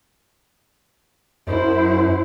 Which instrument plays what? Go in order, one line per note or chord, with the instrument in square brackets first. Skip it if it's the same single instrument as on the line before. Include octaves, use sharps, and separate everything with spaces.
[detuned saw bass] F#2 [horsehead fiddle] E4 C5